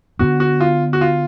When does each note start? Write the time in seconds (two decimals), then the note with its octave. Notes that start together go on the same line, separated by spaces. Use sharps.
0.19 D3 F#3 B3 D4 F#4
0.40 F#4
0.61 F4
0.93 F#4
1.01 F4